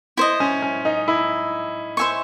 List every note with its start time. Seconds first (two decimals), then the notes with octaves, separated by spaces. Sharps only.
0.17 E4 C5 D#5
0.40 C#4
0.62 C#4
0.85 D#4
1.08 E4
1.97 C5 E5 G#5 C#6